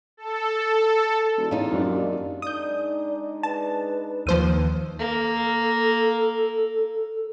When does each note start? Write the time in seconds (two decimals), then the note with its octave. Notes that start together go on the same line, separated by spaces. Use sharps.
0.17 A4
1.38 E1
1.51 E2 D#4 F4
1.71 G#1 F#2 D4
1.84 D#2
2.42 G#3 D4 D#4 D5 D#6 G6
3.43 B4 A5
4.27 D#2 F3 C5 D#7
4.99 A#3 A4